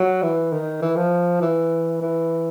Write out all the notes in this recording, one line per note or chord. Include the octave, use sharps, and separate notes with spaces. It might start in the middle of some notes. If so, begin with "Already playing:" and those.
Already playing: F#3
E3
D#3
E3
F3
E3
E3